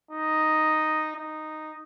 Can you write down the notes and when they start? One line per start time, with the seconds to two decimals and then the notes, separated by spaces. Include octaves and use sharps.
0.11 D#4
1.17 D#4